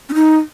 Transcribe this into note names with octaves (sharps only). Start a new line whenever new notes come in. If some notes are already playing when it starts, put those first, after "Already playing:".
C#4
D#4